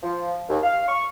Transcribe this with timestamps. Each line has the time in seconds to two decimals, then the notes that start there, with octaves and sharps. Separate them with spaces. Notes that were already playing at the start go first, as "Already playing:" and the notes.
0.02 F3
0.49 D#2
0.63 F5
0.88 C#6